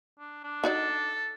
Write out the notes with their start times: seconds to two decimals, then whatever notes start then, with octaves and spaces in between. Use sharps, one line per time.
0.19 D4
0.44 D4
0.64 D#4 F#4 A4 D5